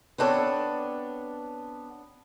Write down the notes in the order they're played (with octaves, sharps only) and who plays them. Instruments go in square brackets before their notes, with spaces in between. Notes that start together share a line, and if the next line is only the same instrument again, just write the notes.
[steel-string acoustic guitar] B3 C4 D4 A4 C#5